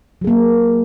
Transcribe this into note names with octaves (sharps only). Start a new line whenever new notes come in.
F#3 A#3 G#4